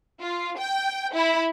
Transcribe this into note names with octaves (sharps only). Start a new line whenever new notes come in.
F4
G5
E4